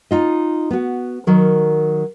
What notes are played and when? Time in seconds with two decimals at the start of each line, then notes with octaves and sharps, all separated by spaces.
0.11 D#4 F4 D#5
0.71 B3 F#4
1.27 D#3 F#3 A#4